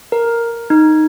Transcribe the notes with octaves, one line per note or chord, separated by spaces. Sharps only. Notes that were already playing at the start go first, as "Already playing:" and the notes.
A#4
D#4